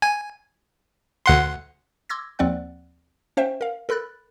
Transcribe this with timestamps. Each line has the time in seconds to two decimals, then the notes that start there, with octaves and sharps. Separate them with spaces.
0.02 G#5
1.26 D2 F#5 C6
2.09 C6 D6 E6 G#6 A#6
2.39 D#2 F3 C4 D5 F#5 F#6
3.37 C#4 C5 E5 G5
3.61 A#4 F5
3.89 A4 A#4 B5 F#6 A6